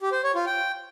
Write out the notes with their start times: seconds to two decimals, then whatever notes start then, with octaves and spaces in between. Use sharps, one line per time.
0.01 G4
0.12 C5
0.23 C#5
0.35 F4
0.46 G5